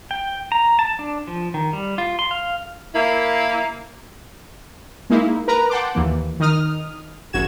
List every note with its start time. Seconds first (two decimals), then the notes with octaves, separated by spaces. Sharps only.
0.11 G5
0.52 A#5
0.79 A5
0.99 D4
1.28 F3
1.54 D#3
1.73 G3
1.98 F4
2.19 C6
2.31 F5
2.95 A#3 E4
5.10 G#3 A#3 D#4 E4
5.48 A#4 B4 A#5
5.70 F#5 G5 A5 C6 D6
5.95 D#2 E3 A#3
6.40 D#3 D#4 D#6 F6
7.33 G#1 F#2 F#4 G#6 E7